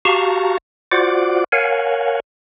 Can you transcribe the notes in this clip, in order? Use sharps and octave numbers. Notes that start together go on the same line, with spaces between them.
F#4 G4 F5 A5 A#5 C#6
F4 F#4 C5 D5 F#5 D6
A#4 C#5 F5 F#5 G#5